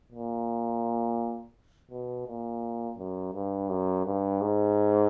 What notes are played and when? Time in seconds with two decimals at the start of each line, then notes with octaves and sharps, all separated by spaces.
0.12 A#2
1.91 B2
2.27 A#2
2.98 F#2
3.34 G2
3.69 F#2
4.06 G2
4.41 G#2